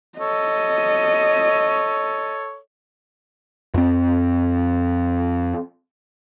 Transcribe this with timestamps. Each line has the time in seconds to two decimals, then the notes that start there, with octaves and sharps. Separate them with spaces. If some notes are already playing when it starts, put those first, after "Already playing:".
0.19 A4 C#5 D#5
3.74 F2 C4